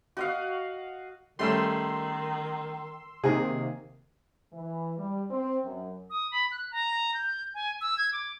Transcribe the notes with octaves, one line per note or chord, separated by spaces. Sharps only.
F#4 D#5 F5
D#3 G3 A3 C#4 C6 E6
C3 D#3 A#3 G#4
E3
G3
C4
F#2
D#6
B5
F#6
A#5
G6
G#5
E6
G#6
D6